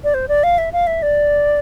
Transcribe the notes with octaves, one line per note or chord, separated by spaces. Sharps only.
D5
C5
D5
F5
E5
F5
E5
D5